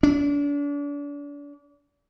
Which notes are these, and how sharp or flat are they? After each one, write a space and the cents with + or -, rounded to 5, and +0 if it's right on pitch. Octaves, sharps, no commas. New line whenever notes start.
D4 -35